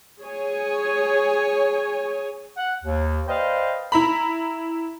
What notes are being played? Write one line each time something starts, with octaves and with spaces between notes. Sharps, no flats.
G#4 C#5 G#5
F#5
D#2
B4 C5 D5 D#5 F5 G5
E4 A#5 B5